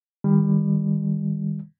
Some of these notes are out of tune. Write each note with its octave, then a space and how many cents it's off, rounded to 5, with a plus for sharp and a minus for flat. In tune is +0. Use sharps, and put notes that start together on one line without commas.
D#3 +0 G3 +25